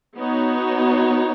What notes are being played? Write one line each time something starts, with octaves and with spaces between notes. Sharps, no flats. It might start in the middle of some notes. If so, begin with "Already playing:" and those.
B3 D#4 F#4 C#5